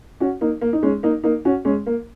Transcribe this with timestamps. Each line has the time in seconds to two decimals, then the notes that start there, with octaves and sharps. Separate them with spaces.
0.20 C#4 F#4
0.41 A#3 D#4
0.61 A#3
0.73 D#4
0.83 G#3 C#4
1.03 A#3 D#4
1.24 A#3 D#4
1.45 C#4 F#4
1.65 G#3 C#4
1.86 A#3